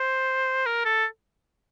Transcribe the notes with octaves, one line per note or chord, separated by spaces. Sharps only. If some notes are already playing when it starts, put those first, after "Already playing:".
Already playing: C5
A#4
A4